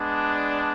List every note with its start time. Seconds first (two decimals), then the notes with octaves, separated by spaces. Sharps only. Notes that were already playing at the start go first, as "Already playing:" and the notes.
Already playing: G#3 B3 D4